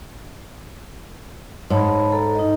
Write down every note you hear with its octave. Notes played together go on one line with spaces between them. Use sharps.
G#2 C#5 A5 B5
A4 A#5
D#4 D#5